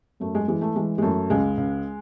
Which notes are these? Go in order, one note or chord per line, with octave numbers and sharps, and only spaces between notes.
F#2 A3
G#3
E3 G#3
A3
E3 G#3
G#3
F#2 A3
C#2 G#3
C#2